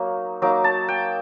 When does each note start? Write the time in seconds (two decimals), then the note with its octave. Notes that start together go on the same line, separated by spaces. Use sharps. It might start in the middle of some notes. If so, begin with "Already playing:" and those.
Already playing: F#3 A#3 D#4
0.42 F#3 A#3 D#4 D6
0.64 A5
0.88 G5